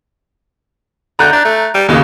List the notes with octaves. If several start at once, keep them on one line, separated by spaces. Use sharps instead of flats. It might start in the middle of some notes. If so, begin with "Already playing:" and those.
D3 A#5 F#6 G6
D4
A3
G3
D#2 C#3 G#3 A#3